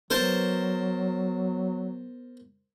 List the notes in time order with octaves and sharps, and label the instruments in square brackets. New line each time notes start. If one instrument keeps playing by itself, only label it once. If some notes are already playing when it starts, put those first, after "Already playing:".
[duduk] F#3 [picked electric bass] B3 [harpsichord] A#4 C5 A5